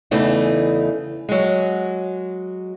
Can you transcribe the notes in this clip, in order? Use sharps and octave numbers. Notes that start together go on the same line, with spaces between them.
E2 C#3 E3 A3 D#4
F#3 G#3